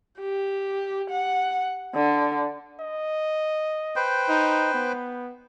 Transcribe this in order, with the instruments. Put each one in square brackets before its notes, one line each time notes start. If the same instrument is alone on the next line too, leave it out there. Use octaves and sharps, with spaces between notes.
[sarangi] G4
F#5
D3
[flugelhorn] D#5
[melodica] B4 C5 G5
[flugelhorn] D#4
B3